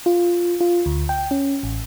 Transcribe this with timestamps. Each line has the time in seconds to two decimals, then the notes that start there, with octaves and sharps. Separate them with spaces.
0.06 F4
0.61 F4
0.86 D2
1.09 G5
1.31 C#4
1.63 A1